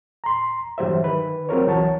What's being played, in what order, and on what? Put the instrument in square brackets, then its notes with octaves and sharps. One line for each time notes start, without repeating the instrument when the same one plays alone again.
[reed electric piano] A#5 C6
G2 E3 F#3 G4 C5 E5
D#3 B4
F#3 C4 F4 A#4 C#5
C2 E3 F#3 C#5 A5